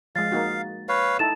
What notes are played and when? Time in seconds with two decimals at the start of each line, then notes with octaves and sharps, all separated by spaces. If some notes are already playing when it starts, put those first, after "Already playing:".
0.16 F3 G#3 F5 A6
0.32 A#3 D#4 F#4
0.89 B4 C#5 F5
1.19 D#4 E4 A4 A5 A6 E7